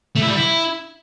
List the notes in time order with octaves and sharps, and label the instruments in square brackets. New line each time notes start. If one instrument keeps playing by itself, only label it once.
[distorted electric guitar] A3
E4
G3
E4